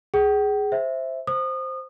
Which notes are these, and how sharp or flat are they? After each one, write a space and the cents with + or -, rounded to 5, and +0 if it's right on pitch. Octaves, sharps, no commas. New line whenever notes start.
G#4 +0 G5 -45
C5 +0 E5 +0
C5 +0 D#6 -30